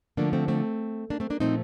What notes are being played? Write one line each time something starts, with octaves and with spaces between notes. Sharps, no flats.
D3 F3 A3 A#3 D4
A3 C4
A3 C4
A#3 D4
A3 C4
A#3 D4
A#2 F3 A3 C4 D#4